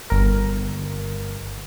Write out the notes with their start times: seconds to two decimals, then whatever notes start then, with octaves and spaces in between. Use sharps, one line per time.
0.10 G1 A#4